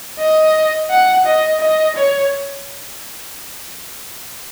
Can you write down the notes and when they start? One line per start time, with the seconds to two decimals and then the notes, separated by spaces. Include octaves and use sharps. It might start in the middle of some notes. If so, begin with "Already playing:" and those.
0.19 D#5
0.90 F#5
1.26 D#5
1.61 D#5
1.96 C#5